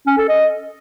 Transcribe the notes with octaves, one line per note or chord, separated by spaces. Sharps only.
C#4
A4
D#5